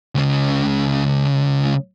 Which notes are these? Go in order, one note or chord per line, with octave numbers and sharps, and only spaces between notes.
C#2 C#3